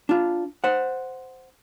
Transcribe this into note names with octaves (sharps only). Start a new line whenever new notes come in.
D4 F4
C5 F#5